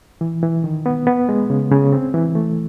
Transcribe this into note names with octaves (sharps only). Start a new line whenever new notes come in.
E3
E3
D#3
B3
B3
G#3
C#3
C#3
C4
E3
A3